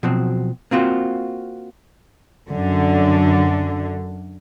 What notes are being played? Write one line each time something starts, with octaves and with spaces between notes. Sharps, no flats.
B2 F3 F#3 C4
A#3 C4 F4 F#4
F#2 D3